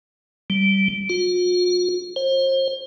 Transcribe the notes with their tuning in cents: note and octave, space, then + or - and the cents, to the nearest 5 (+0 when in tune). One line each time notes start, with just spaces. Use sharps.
G3 -15
F4 +45
C5 +35